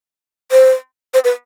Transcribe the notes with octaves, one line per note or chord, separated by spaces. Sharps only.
C5
C5
B4